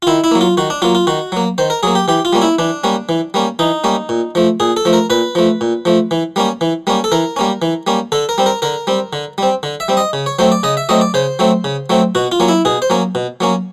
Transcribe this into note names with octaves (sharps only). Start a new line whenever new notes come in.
F4
D#3 E4
E4
F#3 A#3
F4
D#3 F#4
D4
F#3 A#3 F4
F4
D#3 F#4
F#3 A#3
D#3 C5
A#4
F#3 A#3 G#4
G4
E3 G4
F4
G3 A#3 C#4
E4
E3 D4
G3 A#3 C#4
E3
G3 A#3 C#4
E3 D#4
G3 A#3 C#4
A#2
F3 A3
A#2 G#4
A4
F3 A3
A#4
A#2 B4
F3 A3
A#2
F3 A3
E3
G3 A#3 C#4
E3
G3 A#3 C#4
A4
E3 A#4
G3 A#3 C#4
E3
G3 A#3 C#4
D3 A4
A#4
G3 C4
A#4
D3 A#4
G3 C4
D3
G3 C4
D3
E5
G3 C4
D#5
C#3
C#5
F#3 A3 C4 C5
D5
C#3 D#5
E5
F#3 A3 C4 D#5
D5
C#3 C5
F#3 A3 C4
C#3
F#3 A3 C4
B2 F#4
F4
F#3 A#3 C#4
E4
B2 G#4
C5
F#3 A#3 C#4
B2
F#3 A#3 C#4